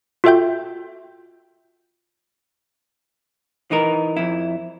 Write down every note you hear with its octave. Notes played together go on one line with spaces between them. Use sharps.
F4 F#4 A4 E5 G5 G6
E3 D#4 A#4
F2 E4